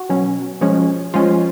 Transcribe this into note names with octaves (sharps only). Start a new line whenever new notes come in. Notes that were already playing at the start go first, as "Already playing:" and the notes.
Already playing: F#4
B2 F#3 C#4
F3 G#3 C#4
F3 G#3 C#4 F4